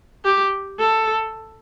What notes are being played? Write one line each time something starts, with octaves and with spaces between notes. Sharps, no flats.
G4
A4